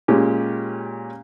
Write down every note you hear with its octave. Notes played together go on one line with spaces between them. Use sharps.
A#2 G#3 C#4 G4